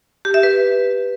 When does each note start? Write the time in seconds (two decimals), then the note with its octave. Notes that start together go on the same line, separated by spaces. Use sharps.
0.25 G4
0.34 E5
0.43 B4